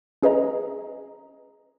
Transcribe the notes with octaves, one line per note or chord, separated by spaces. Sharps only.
C#4 G#4 B4 D#5 A#5